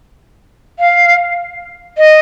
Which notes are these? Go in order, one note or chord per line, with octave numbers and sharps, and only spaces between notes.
F5
D#5